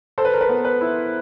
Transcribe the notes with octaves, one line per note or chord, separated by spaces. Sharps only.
A4 C5
B4
A#4
B4
B3
B4
E4